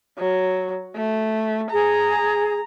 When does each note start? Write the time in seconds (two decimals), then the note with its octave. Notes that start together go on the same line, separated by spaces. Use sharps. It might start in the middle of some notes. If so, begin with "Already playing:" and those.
0.18 F#3
0.96 A3
1.71 G#4 A#5